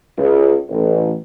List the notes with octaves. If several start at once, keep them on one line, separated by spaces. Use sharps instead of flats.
C#2
A1